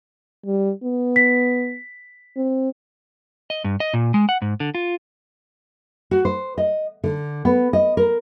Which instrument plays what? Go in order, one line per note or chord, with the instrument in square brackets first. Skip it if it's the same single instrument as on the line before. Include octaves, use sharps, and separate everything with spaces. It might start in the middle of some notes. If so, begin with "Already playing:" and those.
[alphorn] G3
B3
[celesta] B6
[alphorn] C4
[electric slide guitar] D#5
G2
D#5
A#2
G#3
F#5
G#2
D3
F4
[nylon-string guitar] F#4
C5
D#5
D3
B3
D#5
A#4